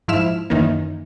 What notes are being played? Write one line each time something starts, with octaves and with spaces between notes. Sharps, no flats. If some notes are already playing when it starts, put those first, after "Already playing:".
G#2 F3 E4 E6 F6
F#2 D#3 E3 A#3